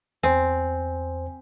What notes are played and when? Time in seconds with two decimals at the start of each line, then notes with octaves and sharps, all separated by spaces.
0.23 E2 C4 C5 G#5